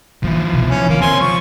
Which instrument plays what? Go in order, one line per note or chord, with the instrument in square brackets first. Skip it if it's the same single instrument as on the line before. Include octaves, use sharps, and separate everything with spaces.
[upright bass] E3 A#3 [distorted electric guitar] F3 E4
[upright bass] C2 B2
[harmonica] C#4
[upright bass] C3 [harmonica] A#3 F4
[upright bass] D#2 C#3 [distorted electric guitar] C4 C#5 [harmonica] G#5 C6
[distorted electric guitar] F3 [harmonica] C#6